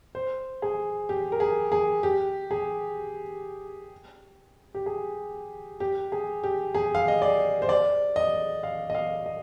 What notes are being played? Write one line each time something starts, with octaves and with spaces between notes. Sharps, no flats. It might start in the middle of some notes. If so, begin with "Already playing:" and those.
C5
G#4
G4
A#4
G#4
G#4
G4
G#4
G4
G#4
G4
G#4
G4
G#4
F5
D#5
D5
C5
D5
D#5
F5
D#5
F5
D#5